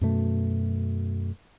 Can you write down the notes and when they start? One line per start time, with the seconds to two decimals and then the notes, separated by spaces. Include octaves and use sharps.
0.01 F#2 B2 A3